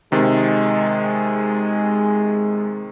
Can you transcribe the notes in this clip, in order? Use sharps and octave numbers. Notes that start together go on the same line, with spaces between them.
C3 D#3 G#3